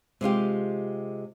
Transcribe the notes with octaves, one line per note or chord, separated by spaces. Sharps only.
C3 G#3 F4 G4